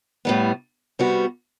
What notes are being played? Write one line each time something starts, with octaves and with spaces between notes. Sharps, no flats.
A2 G3 B3
C3 G3 B3 F#4